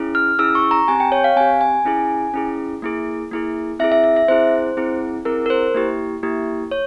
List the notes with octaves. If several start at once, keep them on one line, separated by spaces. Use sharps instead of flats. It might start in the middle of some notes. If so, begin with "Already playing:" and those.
Already playing: C#4 E4 G#4
F6
C#4 E4 G#4 E6
C#6
A#5
C4 G4 G#5
G5
C#5
F5
C4 G4 G#5
G#5
C#4 E4 G#4
C#4 E4 G#4
A#3 E4 G#4
A#3 E4 G#4
C4 E4 G#4 E5
E5
E5
E5
C4 E4 G#4 C5
C4 E4 G#4
C4 E4 G#4 A#4
A#4
C5
A#3 E4 G4
A#3 E4 G4
C#5